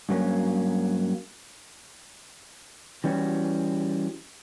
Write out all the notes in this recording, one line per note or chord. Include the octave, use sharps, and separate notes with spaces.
G2 F#3 A#3 C#4
E3 G3 C#4 F#4